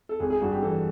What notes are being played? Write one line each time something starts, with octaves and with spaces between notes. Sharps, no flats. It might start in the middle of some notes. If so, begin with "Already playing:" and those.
A4
G#1 G#4
G#4
G2 F#4
G4
E3 A4